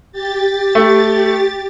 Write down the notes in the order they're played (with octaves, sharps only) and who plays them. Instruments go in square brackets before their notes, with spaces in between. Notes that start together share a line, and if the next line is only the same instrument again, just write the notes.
[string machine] G4 A6
[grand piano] A3